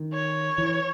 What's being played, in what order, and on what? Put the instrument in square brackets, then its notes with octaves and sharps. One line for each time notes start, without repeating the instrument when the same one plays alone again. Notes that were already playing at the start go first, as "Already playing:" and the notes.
Already playing: [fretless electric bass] D#3
[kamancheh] C#5
[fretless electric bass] E3